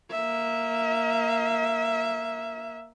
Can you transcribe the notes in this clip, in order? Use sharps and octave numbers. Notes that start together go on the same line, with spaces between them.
A#3 E5